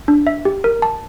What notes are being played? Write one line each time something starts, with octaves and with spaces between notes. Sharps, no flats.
D4
E5
G4
A#4
A5